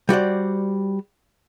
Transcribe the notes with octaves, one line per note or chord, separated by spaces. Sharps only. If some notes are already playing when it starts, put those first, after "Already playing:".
G3 F#4 C5 D5